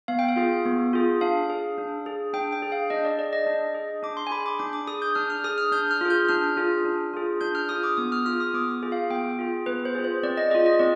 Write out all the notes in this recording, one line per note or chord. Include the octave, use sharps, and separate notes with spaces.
B3 F5
G5
F5
F4 G#4
B3
F4 G#4
D4 F5
G#4
D4
G#4
D4 G5
G5
G#4
F5
D4 D#5
D5
G#4 D5
D#5
D4
G#4
D4 D6
C6
G#5
G#4 B5
D6
D4 D6
D6
G#4 D#6
G6
D4 F6
F6
G#4 D#6
F6
D4 G6
F6
F4 G#4
G6
D4 F6
F4 G#4
D4
F4 G#4
D4 G6
F6
F4 G#4 D#6
D6
B3 D#6
F6
F4 G#4 F6
D#6
B3 D6
F4 G#4
F5
B3 G5
F4 G#4
B3 B4
C5
F4 G#4
C5
C4 D5
D#5
F4 G#4 D#5
D#5
C4 D5